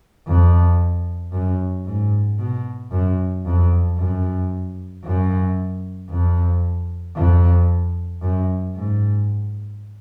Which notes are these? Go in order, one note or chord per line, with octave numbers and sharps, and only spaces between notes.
F2
F#2
G#2
B2
F#2
F2
F#2
F#2
F2
F2
F#2
G#2